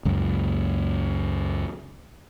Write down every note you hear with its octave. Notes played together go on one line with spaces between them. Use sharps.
C#2 F#2